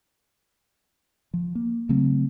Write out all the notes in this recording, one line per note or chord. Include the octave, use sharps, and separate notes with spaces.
F3
A#3
C#3 F#3 A3 C4